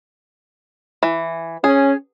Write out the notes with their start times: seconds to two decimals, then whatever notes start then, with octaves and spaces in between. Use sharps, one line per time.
1.03 E3
1.64 C#4 G#4